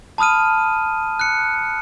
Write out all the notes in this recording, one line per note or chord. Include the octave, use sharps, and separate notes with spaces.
A5 B5 D#6 F6 D#7
F#6 C#7